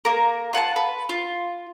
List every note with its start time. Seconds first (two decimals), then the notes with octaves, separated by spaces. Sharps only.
0.05 A#3 A#4
0.53 F4 F#5 G#5 A5
0.76 B4
1.09 F4